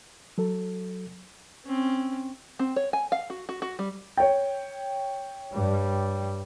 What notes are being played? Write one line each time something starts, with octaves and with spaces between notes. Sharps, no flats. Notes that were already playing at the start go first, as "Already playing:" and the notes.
F#3 A4
C4 C#4
C4
C#5
G#5
F5
F#4
F#4
F#4
G3
C#5 G5
G2 G3